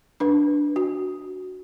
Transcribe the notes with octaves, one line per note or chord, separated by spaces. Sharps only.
D4 B4
F#4